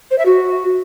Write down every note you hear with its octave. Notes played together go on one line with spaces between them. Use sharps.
C5
E5
F#4